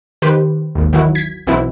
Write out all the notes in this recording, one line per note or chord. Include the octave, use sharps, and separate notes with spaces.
D#3 G4 B4 C5
G#1 D#2
D#3 E3 F#3 E4 F#4
G#6 B6
B1 B2 E3 C4 E4